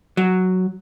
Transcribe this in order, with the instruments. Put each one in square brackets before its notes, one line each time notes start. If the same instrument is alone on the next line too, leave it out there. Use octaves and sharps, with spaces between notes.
[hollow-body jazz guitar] F#3